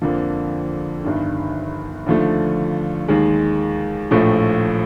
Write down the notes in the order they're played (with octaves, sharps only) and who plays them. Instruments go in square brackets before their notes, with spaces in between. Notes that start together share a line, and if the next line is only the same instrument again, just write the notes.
[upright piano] F2 D3 F3 A#3
G1 G2 D#3
D#2 D3 F3 A3
D#2 D#3 G#3
A#1 A2 F3 A3